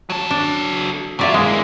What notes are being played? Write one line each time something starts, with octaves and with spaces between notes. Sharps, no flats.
F#3 A4
D4
A#2 F#3 F4 D5 E5
E3 G#3 A#3